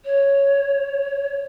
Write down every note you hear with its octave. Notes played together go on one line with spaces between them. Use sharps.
C#5